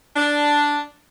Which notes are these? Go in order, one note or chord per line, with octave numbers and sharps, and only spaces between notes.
D4